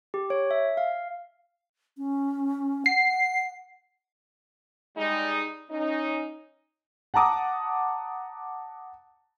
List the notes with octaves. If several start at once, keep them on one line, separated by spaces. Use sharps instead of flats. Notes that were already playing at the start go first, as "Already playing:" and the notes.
G4
C#5
E5
F5
C#4
F#5 C7
G3 G#3 D#4
C#4 D#4
F#5 A5 A#5 D6 D#6